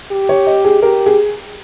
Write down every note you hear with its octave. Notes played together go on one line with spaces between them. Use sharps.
G4
C#5
D#5
G#4
G4 A#4
G#4